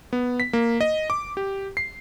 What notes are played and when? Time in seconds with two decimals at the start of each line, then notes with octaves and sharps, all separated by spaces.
0.13 B3
0.40 B6
0.53 A#3
0.81 D#5
1.10 D6
1.37 G4
1.77 C7